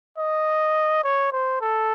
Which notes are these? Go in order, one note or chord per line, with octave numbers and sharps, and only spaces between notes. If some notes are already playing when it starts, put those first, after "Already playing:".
D#5
C#5
C5
A4